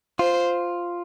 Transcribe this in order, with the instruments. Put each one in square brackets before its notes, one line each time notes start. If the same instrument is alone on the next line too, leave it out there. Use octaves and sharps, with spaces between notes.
[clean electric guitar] F4 [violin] C5